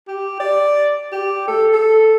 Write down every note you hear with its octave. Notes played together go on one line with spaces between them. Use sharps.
G4
D5
G4
A4
A4